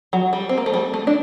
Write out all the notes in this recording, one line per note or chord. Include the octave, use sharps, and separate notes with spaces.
F#3
G3
C4
A#3
A3
G3
A3
D4